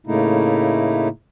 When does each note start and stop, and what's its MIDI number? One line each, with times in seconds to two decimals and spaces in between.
0.07 1.08 45
0.07 1.08 49
0.07 1.08 57
0.07 1.08 58
0.07 1.08 63
0.07 1.08 64